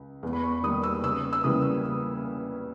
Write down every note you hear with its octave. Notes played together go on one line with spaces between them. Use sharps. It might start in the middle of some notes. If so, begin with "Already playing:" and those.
Already playing: C#2
E2
B5
C#6
D#3 G3 A#3 D#6
E6
C#2 E6
E6
C#3 E3 G3 A#3 D#6